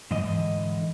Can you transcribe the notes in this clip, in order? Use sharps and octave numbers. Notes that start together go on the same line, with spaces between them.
G#2 D3 E3 D#5